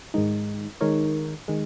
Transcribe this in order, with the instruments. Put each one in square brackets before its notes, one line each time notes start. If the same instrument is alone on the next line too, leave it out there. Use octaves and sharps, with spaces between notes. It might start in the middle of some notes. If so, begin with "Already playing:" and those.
[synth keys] G#2 D#3 G#3 D#4
D#3 G#3 D#4 A#4 C#5
D#3 G#3